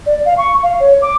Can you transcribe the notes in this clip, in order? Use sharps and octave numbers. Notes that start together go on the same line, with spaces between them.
D5
F5
C#6
F5
C#5
D6